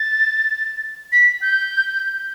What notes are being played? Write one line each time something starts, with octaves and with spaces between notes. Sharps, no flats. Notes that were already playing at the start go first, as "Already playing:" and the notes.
Already playing: A6
B6
G6